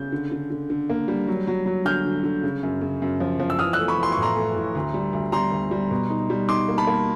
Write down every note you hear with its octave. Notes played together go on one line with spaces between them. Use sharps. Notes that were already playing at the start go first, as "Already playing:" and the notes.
Already playing: C#3 G6
D3
D3
D3
D3
A#3
G3
F#3
F#3
F#3
D3 F6 G6
D3
D3
C#3
F#2
C#3
F#2
F3
F3
E6
E3 D#6 F6
E6 F#6
A3
B5 C#6
E3 C6
C#6
A2
A#5 C6
A3
A2
D2
G3
D2
G3 A#5 C6
D2
G3
B2
D#4
G3
D#4 C6 D6
A#3
A5 B5
A#3